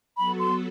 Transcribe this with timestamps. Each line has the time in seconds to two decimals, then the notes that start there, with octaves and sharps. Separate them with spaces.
0.17 F#3 B3 F#4 A4 B5
0.39 C6